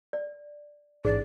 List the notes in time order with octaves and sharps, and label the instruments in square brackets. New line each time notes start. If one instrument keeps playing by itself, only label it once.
[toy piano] D5
[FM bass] A1 [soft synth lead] G#2 [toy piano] G#4 [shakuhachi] D5